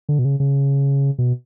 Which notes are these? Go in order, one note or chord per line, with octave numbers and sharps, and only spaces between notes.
D3
B2
C#3
C#3
B2